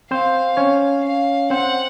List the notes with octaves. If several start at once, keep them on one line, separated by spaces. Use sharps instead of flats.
C4 C5 F5
C#4 C#5
F5
C4 C5 F#5